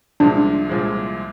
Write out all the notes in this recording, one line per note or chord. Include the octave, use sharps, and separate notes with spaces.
C2 A#2 F3 G#3 D4
C2 A#2 F3 G#3